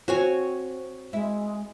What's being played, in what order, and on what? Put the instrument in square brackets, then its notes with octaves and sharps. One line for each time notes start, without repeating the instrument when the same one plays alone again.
[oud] C4 [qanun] F#4 C#5 G#5
[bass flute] G#3 [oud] E4